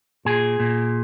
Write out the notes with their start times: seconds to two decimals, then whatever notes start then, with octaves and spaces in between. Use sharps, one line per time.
0.25 A#2 G#4
0.60 A#2